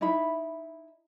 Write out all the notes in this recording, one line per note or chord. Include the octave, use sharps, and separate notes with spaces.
D#4 E4 E5 B5